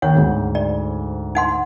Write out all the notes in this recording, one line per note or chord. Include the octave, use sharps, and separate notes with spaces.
D#2 C#5 F#5
D2 G#2
D5
D#4 F#5 C6